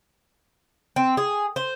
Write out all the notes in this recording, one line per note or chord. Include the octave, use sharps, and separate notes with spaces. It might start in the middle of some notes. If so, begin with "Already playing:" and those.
C4
G#4
C5